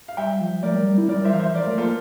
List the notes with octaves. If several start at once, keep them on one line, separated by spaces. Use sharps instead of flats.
F5
G3 E5 G5
F3
A3 A#4 D5
G3
G3
E4
G3 A#4 D5
C5 E5
E3 F5
C5 E5
F3 A#4 D5
A3
A#3 F4 A4